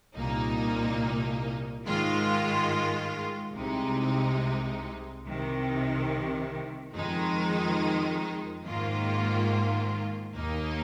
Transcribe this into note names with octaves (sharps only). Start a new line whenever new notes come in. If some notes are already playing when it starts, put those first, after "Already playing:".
C2 A#2 A#3 D#4
G#2 D#3 G#3 F4
C2 C3 G#3 D#4
C2 C3 D#3
F2 D#3 G#3 D#4
G#2 D#3 A#3 F4
D#2 D#3 A#3 D#4